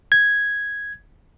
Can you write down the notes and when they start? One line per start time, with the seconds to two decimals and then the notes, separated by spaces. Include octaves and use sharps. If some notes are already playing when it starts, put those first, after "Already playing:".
0.12 G#6